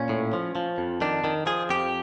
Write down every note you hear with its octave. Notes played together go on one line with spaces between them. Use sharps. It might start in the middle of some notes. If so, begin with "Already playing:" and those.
Already playing: A#2 C#4
A2
F3
F3
F2
D#3 D4
D#3
F3 G#4
F2 G4